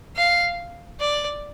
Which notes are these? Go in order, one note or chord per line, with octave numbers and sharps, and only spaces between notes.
F5
D5